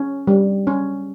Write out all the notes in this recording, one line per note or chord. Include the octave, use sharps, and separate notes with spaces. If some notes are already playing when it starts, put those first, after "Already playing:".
Already playing: C#4
G3
C#4